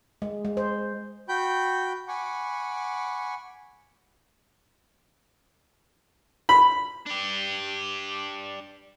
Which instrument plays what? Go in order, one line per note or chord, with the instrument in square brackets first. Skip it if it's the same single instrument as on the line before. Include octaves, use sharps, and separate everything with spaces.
[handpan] G#3
G#3
C5
[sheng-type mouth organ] F#4 G5 B5 G6
F#5 G#5 B5 C#6 D6
[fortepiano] B5
[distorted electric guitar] D4 G4